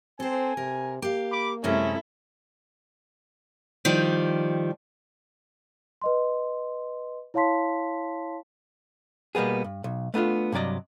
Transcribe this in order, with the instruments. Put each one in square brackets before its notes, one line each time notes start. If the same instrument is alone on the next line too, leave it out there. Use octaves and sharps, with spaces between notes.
[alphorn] C4 [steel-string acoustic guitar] A4 C5 [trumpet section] G#5
[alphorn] C3 [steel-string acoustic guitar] A#4
[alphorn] A#3 [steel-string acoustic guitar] G4 F5
[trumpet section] B5 D6
[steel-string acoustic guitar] F#2 C3 G#3 [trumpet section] C#4 [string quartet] E4 A4
[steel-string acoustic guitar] D#3 F3 G3
[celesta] B4 D#5 C6
E4 C#5 F5 A5 C6 B6
[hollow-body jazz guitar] B2 G3 A#3 B3 G#4
G2
B1
A3 B3 D4 D#4 F4
G2 C3 F#3 D5 D#5